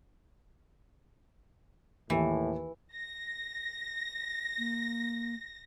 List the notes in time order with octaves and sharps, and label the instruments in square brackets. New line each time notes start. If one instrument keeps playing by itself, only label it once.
[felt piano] D#2 [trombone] A2 [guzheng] E3
[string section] A#6
[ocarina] A#3